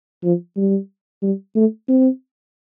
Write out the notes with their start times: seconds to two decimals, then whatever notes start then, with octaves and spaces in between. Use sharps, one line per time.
0.24 F3
0.57 G3
1.23 G3
1.56 A3
1.89 C4